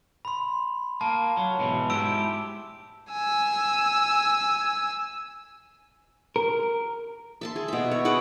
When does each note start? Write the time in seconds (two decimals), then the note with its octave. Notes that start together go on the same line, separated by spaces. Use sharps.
0.25 B5 C6
1.01 A#3 A5
1.37 F#3
1.58 G#2 B2 E3
1.90 G#2 E4 G4 E6 D7
3.11 G#5 E6
6.36 A#4
7.41 E5 A5 C6
7.56 G#4
7.68 B2 E5
7.91 C#5
8.05 G#4 B4 F#5 G5